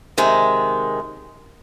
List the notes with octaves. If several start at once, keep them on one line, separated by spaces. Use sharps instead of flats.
C3 D#3 G#3